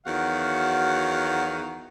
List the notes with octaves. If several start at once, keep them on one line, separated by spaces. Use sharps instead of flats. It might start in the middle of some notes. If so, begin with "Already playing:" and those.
E2 D#3 F#3 F#4 F5 F#5